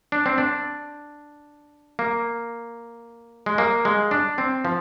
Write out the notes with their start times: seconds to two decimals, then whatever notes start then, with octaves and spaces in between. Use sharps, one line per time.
0.12 D4
0.26 C4
0.38 D4
1.99 A#3
3.46 G#3
3.58 A#3
3.85 G#3
4.11 D4
4.38 C4
4.65 F3